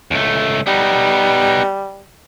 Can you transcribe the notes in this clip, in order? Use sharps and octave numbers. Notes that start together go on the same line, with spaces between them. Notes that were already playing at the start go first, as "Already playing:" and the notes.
C#2 A3
G3 B3 D#4